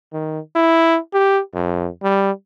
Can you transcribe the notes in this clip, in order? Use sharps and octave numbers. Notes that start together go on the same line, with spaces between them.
D#3
E4
G4
F2
G3